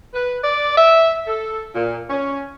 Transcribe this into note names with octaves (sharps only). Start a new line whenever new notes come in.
B4
D5
E5
A4
A#2
C#4